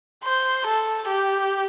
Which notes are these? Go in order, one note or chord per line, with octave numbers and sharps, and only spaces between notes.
C5
A4
G4